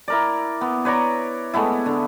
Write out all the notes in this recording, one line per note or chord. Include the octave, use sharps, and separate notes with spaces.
E4 A#4 D5
B3
B4 C#5 D5 A#5
G#3 A3 B3 E4
D3